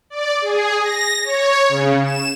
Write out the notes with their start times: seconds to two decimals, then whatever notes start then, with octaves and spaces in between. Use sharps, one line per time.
0.10 D5
0.42 G#4
0.81 A#6
1.24 C#5
1.69 C#3
2.04 E7